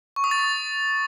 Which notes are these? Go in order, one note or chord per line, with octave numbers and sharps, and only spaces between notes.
C#6
D#6
A6
D#6